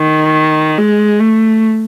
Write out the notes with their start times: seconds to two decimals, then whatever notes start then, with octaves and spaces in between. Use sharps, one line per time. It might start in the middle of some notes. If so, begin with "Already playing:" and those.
Already playing: D#3
0.78 G#3
1.20 A3